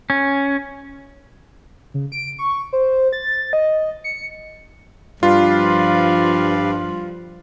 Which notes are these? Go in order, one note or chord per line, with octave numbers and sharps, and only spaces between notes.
C#4
C#3
D7
C#6
C5
A6
D#5
C#7
G2 F3 G3 F4 B4 D5 F5